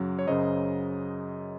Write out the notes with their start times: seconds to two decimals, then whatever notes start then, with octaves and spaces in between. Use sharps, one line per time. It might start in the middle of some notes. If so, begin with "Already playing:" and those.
Already playing: F#2 C#3 F#3
0.19 C#5
0.27 F#2 C#3 F#3 C5 D#5